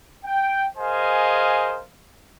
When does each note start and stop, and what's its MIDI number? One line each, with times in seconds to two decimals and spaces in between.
0.24 0.66 79
0.77 1.81 68
0.77 1.81 70
0.77 1.81 72
0.77 1.81 75
0.77 1.81 77
0.77 1.81 80